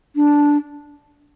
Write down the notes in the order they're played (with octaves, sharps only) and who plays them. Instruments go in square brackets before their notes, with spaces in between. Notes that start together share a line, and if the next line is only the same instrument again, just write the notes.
[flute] D4